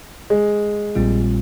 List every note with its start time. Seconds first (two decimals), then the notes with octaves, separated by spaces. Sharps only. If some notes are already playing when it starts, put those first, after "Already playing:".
0.30 G#3
0.95 A#1 A#2 G3 C4 F4